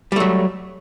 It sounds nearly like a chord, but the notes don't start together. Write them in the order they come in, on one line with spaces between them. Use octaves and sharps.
G3 A3 F#3